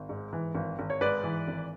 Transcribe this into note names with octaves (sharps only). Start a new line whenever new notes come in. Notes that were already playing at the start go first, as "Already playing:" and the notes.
Already playing: G#1
G#2
E3
G#1
G#1
C#5
G#2 B4 D5
E3
G#1